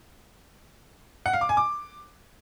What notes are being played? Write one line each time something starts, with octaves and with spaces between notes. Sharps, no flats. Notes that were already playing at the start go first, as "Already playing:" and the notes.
F#5
F5
D6
G#5
D6